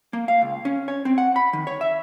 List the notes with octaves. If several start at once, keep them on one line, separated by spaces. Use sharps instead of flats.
A#3
F5
C#2
C#4
C#5
C4
F#5
B5
D#3
C#5
E5